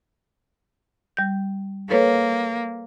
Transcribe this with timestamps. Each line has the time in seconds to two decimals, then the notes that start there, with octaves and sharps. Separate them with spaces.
1.17 G3 G6
1.90 A#3 A4 B4 C#5